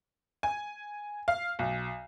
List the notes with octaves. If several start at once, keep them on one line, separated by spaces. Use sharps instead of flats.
G#5
F5
B1